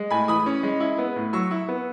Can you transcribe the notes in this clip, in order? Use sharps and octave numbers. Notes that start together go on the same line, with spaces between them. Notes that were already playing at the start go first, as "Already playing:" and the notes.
Already playing: G#3
A2 G#5 B5
E3 B5 D#6
C#4
G#3
E4
B3
A2
F#3 C#6 E6
E4
B3